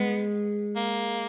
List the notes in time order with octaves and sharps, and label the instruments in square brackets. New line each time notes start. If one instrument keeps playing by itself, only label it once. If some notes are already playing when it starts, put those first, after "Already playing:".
Already playing: [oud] G#3 [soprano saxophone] B3
[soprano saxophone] A#3